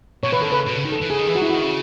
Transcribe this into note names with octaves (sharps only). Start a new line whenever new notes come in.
B2 C#5
E3 B4
D#3 A4
C#3 B4
B2
C#3
D#3
A4
E3
C#3 G#4
D#3
E3 G#4
F#3 F#4
E4
E3
D#3 F#4
C#3